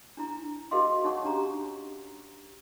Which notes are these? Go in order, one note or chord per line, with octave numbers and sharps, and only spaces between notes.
D4 E4 A#5
F#4 G#4 A#4 D#5 F5 C6
D#4 C#5 F#5 C#6
C#4 D4 G4 A#5